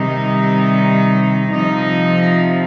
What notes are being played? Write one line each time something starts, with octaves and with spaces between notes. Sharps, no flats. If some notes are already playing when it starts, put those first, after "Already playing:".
Already playing: C3 D#3 G3 D#4
C3 F3 D#4